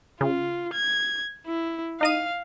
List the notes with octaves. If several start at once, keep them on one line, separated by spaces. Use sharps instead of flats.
C#3 F4
G#6
E4
D#4 D#5 F5 D#7